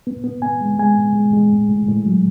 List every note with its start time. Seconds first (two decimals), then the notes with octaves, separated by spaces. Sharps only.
0.07 B3
0.24 B3
0.42 B3 G#5
0.61 G#3
0.79 G#3 G#5
0.97 A2
1.15 G#3
1.33 G#3
1.51 A2
1.69 A2
1.88 A2
2.06 F#3